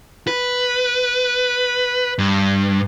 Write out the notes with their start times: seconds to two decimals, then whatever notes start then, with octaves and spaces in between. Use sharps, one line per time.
0.27 B4
2.18 G2